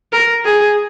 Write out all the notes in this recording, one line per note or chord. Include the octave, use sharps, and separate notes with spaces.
A#4
G#4